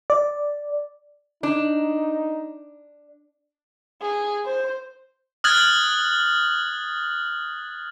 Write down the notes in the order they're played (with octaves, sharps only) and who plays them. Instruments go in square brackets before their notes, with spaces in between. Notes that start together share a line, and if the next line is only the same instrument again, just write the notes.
[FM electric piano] D5
[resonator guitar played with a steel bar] D4 [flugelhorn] D#4
[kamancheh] G#4
C5
[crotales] D#6 F6 F#6 G#6 A6 F#7